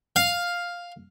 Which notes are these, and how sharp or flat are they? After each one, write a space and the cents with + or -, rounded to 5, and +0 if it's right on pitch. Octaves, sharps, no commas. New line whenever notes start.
F5 +5